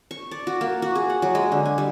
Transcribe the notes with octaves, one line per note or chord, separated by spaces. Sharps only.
C#6
D5
F#4
A#3
F#4
G#4
F#5
F#3
G#3
D3
G#5
G3